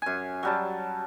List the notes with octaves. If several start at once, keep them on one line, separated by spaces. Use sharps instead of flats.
F#2 G#5
F#3 G3 A5